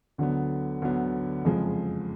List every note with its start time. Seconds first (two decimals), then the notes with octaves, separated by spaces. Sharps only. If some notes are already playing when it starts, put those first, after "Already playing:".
0.18 D2 D3 F#3 B3
0.82 D2 D3 F#3 B3
1.45 F#1 F2 F3 G#3